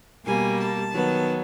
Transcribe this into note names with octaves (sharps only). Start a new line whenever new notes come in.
B2 G3 A#3 G#5
A5
D#3 F#3 B3